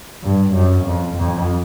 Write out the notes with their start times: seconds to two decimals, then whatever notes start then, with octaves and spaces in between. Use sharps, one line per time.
0.24 G2
0.54 F#2
0.85 F2
1.16 F2